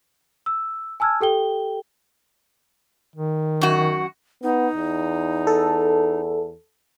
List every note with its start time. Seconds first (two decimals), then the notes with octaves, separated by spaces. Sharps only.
0.46 E6
1.00 G#5 A5 E6 F6 G#6
1.21 G4 A4 G5 G7
3.15 D#3
3.61 F#2 F#4
4.43 B3 D#4
4.75 E2
5.47 A4